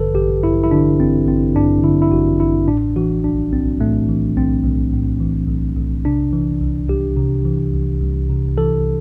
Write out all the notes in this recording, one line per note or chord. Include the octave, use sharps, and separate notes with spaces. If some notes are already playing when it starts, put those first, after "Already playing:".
Already playing: A1 G2 D3 A4 B4
A1 G4
G2 E4
E4
D3 D4
A1 C4
A1 C4
G2 D4
D3 E4
E4
A1 F#4
A1 E4
A2 D4
E3 F#4
B1 D4
B1 C4
A2 A3
E3
B1 C4
B1
A2
E3
B1
B1
C3 D4
E3
C2
C2 G4
C3
E3
C2
C2
C3
E3 A4